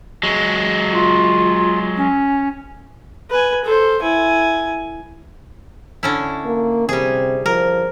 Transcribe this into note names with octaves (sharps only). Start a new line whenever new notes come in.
F#3 G#3
F4
C#4
B4 G#5
A4 C5
E4 G#5
D3 C#4 E4
A#3
C3 G3 G#4
F3 A#4